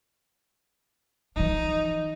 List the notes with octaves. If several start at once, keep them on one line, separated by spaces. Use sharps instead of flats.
E3 F3 D#4